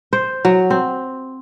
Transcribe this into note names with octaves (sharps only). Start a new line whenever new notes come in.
C5
F#3
C4